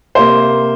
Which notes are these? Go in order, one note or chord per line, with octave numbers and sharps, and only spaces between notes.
C3 A#3 C5